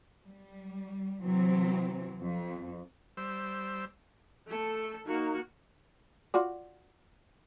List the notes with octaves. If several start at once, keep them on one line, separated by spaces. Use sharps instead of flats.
G3
C3 E3 F#3 C4
F2
G3 C5 E6
A3 A4
A#3 D#4 F#4
F4 F#4 D5